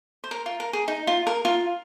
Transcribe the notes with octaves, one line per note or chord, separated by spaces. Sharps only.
C5
A#4
F4
A#4
G#4
D#4
F4
A#4
F4